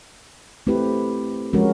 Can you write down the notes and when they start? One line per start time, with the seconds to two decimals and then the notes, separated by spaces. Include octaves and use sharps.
0.67 A3 C4 E4 G4 B4
1.53 F3 G#3 C#4 F#4 A#4